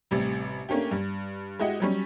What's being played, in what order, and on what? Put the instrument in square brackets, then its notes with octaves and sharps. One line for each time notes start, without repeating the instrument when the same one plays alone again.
[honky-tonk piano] A1 C3 G3
A3 A#3 C#4 D4 G4
G2
G#3 E4 F#4 G4 D#5 F#5
F#3 G3 C#4